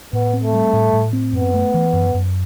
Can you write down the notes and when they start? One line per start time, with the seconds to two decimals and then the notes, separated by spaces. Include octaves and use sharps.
0.13 A2 B3
0.33 C4
0.43 A3
0.53 G3
0.73 A2
0.93 A2
1.13 C4
1.33 F#2 B3
1.54 A3
1.74 E3
1.93 F#2
2.14 F#2